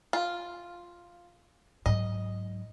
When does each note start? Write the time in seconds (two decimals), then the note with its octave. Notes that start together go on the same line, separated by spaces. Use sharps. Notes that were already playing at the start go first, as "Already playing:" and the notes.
0.13 F4
1.86 G#2 F#3 D#5